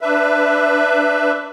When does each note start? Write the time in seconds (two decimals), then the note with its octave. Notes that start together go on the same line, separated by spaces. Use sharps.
0.01 D4 B4 E5